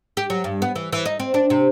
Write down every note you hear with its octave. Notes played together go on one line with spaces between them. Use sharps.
G4
F#3
G2
B3
E3
E3
D#4
C4
D4
C3